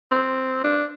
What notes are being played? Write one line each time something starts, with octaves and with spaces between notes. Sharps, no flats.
C4
D4